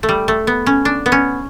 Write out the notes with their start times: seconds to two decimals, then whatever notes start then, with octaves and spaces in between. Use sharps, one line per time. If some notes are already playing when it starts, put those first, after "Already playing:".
0.03 A3
0.09 G3
0.28 A3
0.47 B3
0.66 C#4
0.85 D4
1.06 B3
1.12 C#4